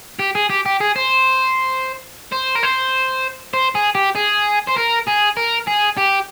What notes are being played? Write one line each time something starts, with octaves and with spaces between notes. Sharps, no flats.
G4
G#4
G4
G4
G#4
C5
C5
A#4
C5
C5
G#4
G4
G#4
C5
A#4
G#4
A#4
G#4
G4